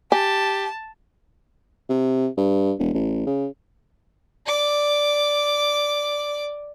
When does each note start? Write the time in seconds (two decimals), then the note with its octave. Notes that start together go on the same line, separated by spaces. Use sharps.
0.12 G4 G#5 A5
1.89 C3
2.38 G2
2.79 E1
2.94 A1
3.27 C#3
4.46 D5 D6